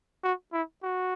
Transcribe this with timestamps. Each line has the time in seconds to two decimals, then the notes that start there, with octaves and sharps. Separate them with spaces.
0.23 F#4
0.53 E4
0.83 F#4